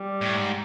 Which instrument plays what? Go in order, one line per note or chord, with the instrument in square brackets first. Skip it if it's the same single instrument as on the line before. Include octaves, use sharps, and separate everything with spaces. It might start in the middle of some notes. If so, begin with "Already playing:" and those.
Already playing: [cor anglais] G3
[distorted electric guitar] A2
G#2